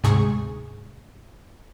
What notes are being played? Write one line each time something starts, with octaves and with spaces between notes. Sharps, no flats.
D2 G#2 C3 G#4 C#6